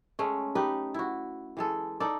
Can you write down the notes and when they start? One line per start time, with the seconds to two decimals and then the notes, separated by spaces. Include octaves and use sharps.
0.19 G#3 A3 C#4
0.55 D#4 G4 B4
0.94 E4 F#4
1.57 E3 G#3 A4
2.00 D#4 A4 D5